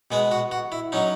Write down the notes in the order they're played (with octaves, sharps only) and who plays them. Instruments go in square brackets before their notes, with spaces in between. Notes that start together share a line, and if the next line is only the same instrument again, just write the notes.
[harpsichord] B2 G#3 B3 G#4
F#4
F#4
E4
F#3 C#4 D#4